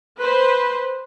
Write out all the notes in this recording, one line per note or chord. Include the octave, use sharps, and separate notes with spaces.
B4 C5 C6